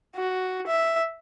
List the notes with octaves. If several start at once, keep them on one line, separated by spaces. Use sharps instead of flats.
F#4
E5